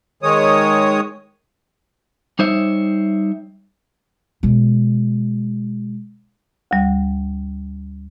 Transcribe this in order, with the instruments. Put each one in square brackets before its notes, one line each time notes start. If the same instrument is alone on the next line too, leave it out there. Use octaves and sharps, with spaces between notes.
[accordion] D#3 G#3 C#5 D#6
[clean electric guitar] G3 D#4 C5 C#5 E5
[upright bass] B2 G#3
[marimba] D2 G3